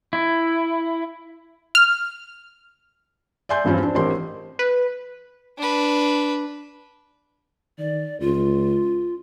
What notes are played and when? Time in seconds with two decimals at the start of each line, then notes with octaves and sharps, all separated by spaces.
0.13 E4
1.75 F6
3.49 D5 E5 G#5 C6 G6
3.64 E2 G2 F3 C4 C#4
3.83 D4 C5
3.95 A1 C4 G4 A#4 C6
4.59 B4
5.58 D4 B4
7.79 D#3 D5
8.20 C#2 F4